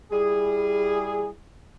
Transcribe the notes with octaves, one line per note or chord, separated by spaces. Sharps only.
G3 E4 G#4